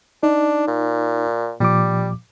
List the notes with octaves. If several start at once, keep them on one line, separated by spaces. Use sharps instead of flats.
D4 D#4
A#2
A#2 F3 G3 D6